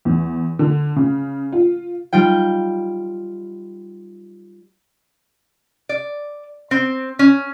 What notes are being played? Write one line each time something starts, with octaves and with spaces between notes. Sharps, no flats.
E2
D3
C#3
F4
G3 D#4 F4 G5
D5
C4
C#4